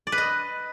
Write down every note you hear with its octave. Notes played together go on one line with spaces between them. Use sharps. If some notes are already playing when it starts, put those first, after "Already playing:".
D5
B4
D#5